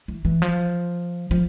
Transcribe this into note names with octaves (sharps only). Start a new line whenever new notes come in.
E3
E3
F3
F3